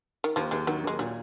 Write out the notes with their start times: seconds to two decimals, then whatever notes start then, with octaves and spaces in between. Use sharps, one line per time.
0.24 D#3
0.36 D#2 F3
0.51 D#2 G#3
0.67 D#3 F#3
0.84 D#2 G#3
0.99 A#2 F#3